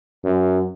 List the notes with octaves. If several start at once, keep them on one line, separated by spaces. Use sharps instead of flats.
F#2